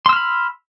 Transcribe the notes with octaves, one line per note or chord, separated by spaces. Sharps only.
B5 C6 E6 F6